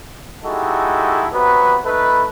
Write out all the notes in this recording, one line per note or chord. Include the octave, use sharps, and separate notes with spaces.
G#3 D#4 E4 F#4 G4 A4
C3 F#3 B3 F#4 B4
A3 D#4 A4 B4